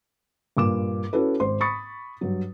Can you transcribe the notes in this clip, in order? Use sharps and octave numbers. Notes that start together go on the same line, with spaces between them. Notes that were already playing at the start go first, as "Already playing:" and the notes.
G2 A#2 D6 E7
C#4 E4 F#4 A4 B4
G#1 C5 C6
B5 C#6 D#6 A6 C#7
G2 F#3